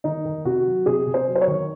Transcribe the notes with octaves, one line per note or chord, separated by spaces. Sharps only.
D#3 D#4
D#3
C3 F#4
F#3
C3 G#4
C3
C5
F#3
C5
C#5
D#3